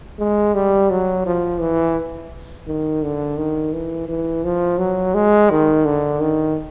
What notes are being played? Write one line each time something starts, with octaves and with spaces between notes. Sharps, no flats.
G#3
G3
F#3
F3
E3
D#3
D3
D#3
E3
E3
F3
F#3
G#3
D#3
D3
D#3